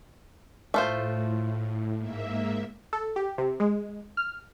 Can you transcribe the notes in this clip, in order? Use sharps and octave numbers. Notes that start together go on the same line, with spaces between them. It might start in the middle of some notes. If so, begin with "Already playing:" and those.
A2 A3 F4 C5
G#2 A#3 E5
A4
G4
C3
G#3
F6